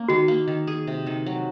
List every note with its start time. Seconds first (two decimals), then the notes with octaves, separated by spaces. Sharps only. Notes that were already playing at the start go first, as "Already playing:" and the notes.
Already playing: A#3 C#4
0.09 D#3 F#4
0.28 A#3
0.48 D#3
0.67 G#4
0.87 C3
1.06 D#3
1.26 F#3